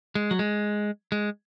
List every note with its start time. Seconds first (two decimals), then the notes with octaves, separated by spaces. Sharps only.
0.15 G#3
0.31 F#3
0.39 G#3
1.12 G#3